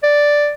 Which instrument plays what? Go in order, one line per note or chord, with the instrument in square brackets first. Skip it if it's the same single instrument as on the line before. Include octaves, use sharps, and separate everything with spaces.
[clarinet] D5